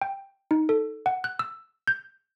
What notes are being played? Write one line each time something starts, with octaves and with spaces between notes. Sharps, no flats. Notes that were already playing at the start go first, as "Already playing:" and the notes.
G5
D#4
A4
F#5
F#6
E6
G6